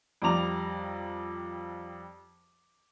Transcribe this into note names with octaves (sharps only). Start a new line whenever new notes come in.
F2 G3 D5 A#5 F7